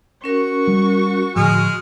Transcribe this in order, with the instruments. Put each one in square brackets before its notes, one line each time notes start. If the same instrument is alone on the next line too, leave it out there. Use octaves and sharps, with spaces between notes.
[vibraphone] C#4 A#4 [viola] F#4 C#6
[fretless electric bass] G3
[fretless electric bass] A2 D3 F3 [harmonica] G#3 G#4 F6